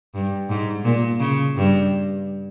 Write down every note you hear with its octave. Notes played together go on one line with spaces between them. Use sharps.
G2
G#2
A#2
C#3
G2